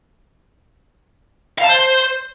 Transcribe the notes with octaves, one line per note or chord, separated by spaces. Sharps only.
F5
A5
C5